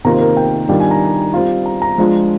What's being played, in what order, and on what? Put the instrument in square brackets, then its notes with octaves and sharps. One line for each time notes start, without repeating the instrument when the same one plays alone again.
[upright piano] C3 D#3 A#3 F4 A#5
C5
A#4
G5
D#3 G3 D4 F4 G5
G#5
A#5
G3 C4 F4
A#5
A#5
F3 G#3 D4 F4